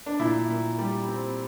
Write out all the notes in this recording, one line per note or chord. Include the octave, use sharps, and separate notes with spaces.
D4
A#2 E4
A#2
G3
C4